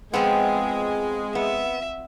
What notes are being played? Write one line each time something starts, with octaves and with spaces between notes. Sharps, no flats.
F3 G#3 B3 C4 G#4
B3 E5